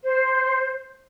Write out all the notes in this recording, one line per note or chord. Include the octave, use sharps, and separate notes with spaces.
C5